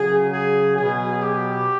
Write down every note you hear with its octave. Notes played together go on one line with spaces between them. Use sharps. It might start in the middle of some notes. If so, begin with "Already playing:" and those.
Already playing: C#3 F#3 G#4
G#4
B2 F#3 G#4
G4